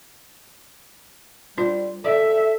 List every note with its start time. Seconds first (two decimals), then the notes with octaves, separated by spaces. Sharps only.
1.58 G3 D4 F4 C5
2.04 A4 D5 E5